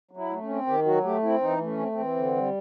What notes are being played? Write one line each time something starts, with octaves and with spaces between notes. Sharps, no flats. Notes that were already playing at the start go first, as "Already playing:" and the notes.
F#3
E4
A3
C#4
C4
D#3 G4
F#3 F#4
A3 G4
C4 E4
E3 D#4
A3
C#4
C4
C4
E3
D3
G3